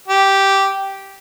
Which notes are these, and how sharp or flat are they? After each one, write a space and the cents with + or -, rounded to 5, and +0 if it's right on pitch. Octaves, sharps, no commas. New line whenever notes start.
G4 -5